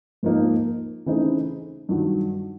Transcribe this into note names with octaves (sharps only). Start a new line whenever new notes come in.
G#2 F3 A#3 D#4
C#3 E3 A3 C4 D#4
G2 D#3 F#3